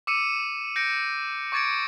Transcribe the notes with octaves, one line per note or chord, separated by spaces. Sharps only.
D6 E6 C#7 D#7 E7
G6 A#6 C#7 D7
C#6 D6 G#6 A6 C#7 D7